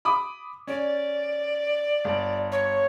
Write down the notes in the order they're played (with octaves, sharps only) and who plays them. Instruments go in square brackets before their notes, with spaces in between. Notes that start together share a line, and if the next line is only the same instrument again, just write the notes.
[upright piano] B5 D6 D#6
[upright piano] C#4 [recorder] D5
[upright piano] G1
[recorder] C#5